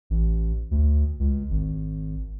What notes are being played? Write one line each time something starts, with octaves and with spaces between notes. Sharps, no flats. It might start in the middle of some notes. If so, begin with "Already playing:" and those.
A1
D2
C#2
G#1